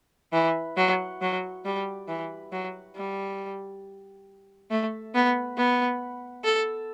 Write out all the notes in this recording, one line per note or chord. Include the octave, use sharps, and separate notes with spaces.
E3
F#3
F#3
G3
E3
F#3
G3
A3
B3
B3
A4